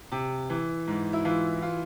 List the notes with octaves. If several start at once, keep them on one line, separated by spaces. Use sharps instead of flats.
C3
E3
G#2
E4
E3 F4
F4